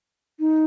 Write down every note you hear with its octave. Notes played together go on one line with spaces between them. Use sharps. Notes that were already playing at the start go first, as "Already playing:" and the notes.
D#4